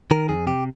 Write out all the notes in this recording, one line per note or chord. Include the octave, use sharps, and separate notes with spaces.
D#3 A#4
F2 G#4
C3 G4